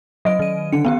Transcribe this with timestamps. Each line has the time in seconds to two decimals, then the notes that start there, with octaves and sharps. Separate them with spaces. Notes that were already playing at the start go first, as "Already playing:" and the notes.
0.25 F#3 D#5 D7
0.39 D#3 D#7
0.72 D3 C#7
0.85 B3 C#4 G4 F5